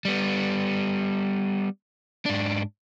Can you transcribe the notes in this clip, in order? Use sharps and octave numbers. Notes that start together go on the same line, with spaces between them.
G3 B3
G#2 D4